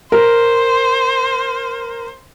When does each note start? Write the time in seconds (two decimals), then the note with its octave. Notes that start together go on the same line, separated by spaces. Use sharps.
0.12 A#4 C5